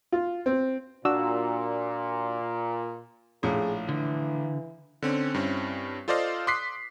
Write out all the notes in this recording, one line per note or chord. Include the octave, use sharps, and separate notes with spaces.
F4
C4
A#2 D4 F#4 E6
A#1 A2 G#4
D3 E3
D3 C4 C#4
G2 C4 C#4 E4
F4 A4 C5 D5 D#5 F5
C6 D6 D#6 F#6 B6 C7